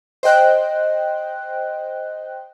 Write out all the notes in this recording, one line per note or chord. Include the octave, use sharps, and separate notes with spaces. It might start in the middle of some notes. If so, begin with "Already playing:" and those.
C5 D#5 G5 F#6